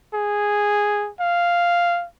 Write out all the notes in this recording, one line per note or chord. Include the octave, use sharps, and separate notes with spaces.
G#4
F5